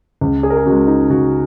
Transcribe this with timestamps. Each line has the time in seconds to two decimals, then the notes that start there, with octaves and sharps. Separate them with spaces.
0.21 C#2
0.43 G#4
0.50 A#4
0.57 G#4
0.66 C#3 G#3 F#4
0.87 D#4
1.10 C#2 F#4